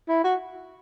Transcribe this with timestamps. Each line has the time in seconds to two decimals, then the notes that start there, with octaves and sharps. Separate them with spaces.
0.08 E4
0.24 F#4